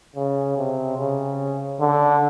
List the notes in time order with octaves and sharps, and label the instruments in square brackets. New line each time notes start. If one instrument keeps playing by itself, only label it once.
[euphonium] C#3
C3
C#3
D3